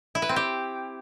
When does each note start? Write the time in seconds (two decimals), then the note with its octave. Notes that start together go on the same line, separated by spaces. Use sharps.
0.15 E4
0.22 B4
0.29 C4
0.36 G4